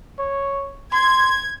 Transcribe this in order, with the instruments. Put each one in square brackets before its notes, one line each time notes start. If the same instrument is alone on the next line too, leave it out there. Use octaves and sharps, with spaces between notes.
[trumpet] C#5
[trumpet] C6 [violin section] G#6